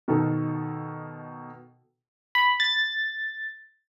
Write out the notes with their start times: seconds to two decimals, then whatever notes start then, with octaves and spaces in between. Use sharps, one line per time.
0.08 B2 D#3 D#4 A4
2.35 B5
2.60 A6